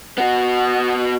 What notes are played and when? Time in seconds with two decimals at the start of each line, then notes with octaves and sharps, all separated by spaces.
0.18 B3 F#4